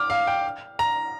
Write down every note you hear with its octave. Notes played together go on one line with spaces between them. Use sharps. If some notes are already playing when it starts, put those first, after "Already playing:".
Already playing: D6 F6
F5
G5
A#5